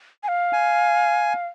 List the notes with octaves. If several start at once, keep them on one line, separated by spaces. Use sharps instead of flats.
G#5
F5
G#5